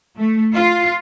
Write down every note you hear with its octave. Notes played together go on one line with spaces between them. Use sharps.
A3
F4